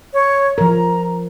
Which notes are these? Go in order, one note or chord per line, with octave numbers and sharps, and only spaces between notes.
C#5
F3 A#4 A#5